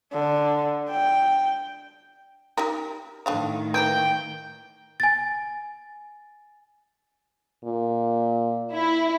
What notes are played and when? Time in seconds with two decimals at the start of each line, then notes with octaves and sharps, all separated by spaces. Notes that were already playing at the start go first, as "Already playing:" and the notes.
0.13 D3
0.91 G5
2.58 D#4 G4 A#4
3.26 A2 D3 D#3 D4 F5
3.74 E3 G#3 A#3 G5
5.00 G#5 A6
7.64 A#2
8.72 E4